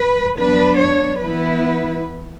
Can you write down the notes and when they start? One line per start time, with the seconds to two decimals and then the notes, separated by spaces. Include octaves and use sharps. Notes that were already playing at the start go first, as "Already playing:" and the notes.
Already playing: B4
0.37 F#3 B3 D4 B4
0.80 C#5
1.21 E3 B3 E4 B4